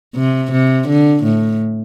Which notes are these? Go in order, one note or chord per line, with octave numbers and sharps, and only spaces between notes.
C3
C3
D3
A2